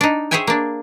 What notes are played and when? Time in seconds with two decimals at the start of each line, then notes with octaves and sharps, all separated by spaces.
0.01 D4 D#4
0.31 G#4 C5 C#5 E5 G5 G#5
0.47 A#3 D4